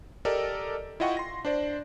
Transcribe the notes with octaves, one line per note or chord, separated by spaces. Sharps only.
G4 A4 A#4 D5 D#5
E4 F4 D#5 F#5 G5 C#6
C6 A#6
D4 C5 D5